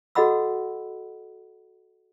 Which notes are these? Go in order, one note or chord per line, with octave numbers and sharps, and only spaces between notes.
F#4 A4 D#5 F#5 B5 E6